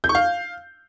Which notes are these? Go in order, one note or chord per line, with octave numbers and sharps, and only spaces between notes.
G6
C#6
F5